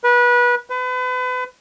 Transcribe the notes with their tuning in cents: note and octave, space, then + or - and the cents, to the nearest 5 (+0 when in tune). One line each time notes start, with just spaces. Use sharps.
B4 -25
B4 +35